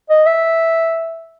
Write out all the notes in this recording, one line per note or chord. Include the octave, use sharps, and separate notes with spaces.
D#5
E5